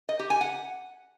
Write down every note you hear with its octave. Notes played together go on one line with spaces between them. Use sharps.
D#5
G4
G#5
F#5